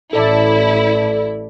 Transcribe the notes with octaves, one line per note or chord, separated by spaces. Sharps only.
A1 E4 A4 D5